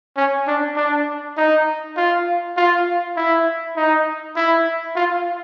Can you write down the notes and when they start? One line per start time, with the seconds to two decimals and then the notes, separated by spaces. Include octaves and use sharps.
0.17 C#4
0.48 D4
0.77 D4
1.37 D#4
1.97 F4
2.57 F4
3.17 E4
3.77 D#4
4.36 E4
4.96 F4